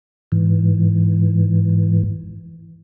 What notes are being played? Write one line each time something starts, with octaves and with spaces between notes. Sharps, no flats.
G#2 E3